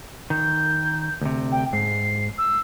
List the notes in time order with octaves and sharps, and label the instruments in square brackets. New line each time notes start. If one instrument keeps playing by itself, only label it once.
[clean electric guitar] D#3 [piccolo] G6
[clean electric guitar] D2 C3
[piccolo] G5
[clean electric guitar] G#2 [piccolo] C7
[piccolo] E6